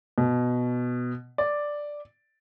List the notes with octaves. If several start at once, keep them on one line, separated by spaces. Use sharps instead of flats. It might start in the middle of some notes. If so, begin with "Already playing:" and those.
B2
D5